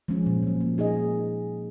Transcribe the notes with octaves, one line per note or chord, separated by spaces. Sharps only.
F3 G#3 C#4
A#2
F#3 C#4
A#3
D#4 G#4 D#5